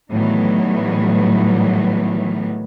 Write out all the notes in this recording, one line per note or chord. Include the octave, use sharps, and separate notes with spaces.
A2 D#3 E3 F#3 G3 B3